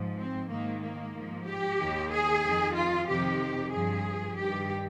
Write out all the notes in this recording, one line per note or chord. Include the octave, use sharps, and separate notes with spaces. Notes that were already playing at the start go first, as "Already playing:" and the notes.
Already playing: G#2 F3
C4
G#2 D#3 A#3
A#3
G#2 F3
G4
D#2 D#3
G#4
F2
D#3
F4
F2 C3 D#3 G4
G2 F3 G#4
G2 D#3 G4